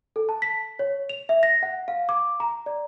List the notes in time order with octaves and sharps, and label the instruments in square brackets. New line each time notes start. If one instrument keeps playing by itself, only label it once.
[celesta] A4
A5
B6
C#5
F7
E5
A#6
F#5
F5
D6
A#5
D5